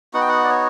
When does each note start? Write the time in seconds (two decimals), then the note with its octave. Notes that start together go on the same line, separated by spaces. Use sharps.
0.14 B3 D#4 F#4 F#5
0.21 G5
0.29 F#5
0.44 D5
0.50 C#5